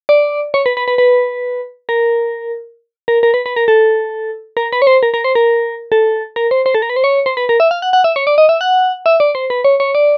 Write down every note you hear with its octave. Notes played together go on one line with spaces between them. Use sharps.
D5
C#5
B4
B4
B4
B4
A#4
A#4
A#4
B4
B4
A#4
A4
A#4
B4
C#5
C5
A#4
A#4
C5
A#4
A4
A#4
C5
C5
A4
A#4
B4
C5
C#5
C5
B4
A#4
E5
F5
F#5
F#5
E5
C#5
D5
D#5
E5
F#5
E5
D5
C5
B4
C#5
C#5
D5